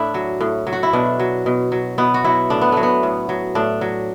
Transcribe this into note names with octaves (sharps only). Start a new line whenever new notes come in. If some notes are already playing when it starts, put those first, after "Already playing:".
Already playing: A2 D4 E4
F#3
A2
F#3
F#4
E4
B2 D4
F#3
B2
F#3
B2 B3
F#4
F#3 E4
A2 D4
B3
F#3 A3
B3
A2
F#3
A2 D4
F#3